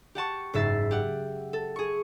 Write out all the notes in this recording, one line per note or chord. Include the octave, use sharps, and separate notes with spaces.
G4 F#5 A5 C#6
F#1 G#2 E5 A6 C7
G4 F#5
A4
G#4 C#6